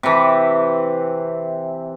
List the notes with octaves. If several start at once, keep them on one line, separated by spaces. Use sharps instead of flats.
C3 E3